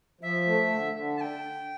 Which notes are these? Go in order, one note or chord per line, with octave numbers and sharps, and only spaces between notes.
F3 E5
A3
D3
D3
A5
G5